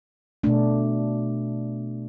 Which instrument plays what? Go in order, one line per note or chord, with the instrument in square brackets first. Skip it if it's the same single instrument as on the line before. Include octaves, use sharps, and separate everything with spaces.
[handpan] B2 A3 D4